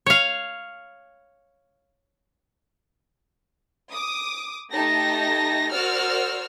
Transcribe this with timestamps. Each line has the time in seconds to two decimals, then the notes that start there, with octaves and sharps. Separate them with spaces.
0.06 C#5 F5
3.92 D6 D#6
4.72 A3 D#4 G4 A5 A#6
5.72 F#4 A#4 C5 D5 E6 F6